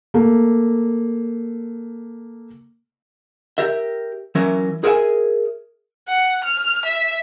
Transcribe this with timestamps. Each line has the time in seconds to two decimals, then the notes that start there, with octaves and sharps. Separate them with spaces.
0.14 A3 A#3
3.58 G4 A#4 E5
4.35 E3 F#3 C#4 A#4 E5
4.84 G#4 A#4 E5 G5 G#5
6.08 F#5
6.44 F6
6.85 E5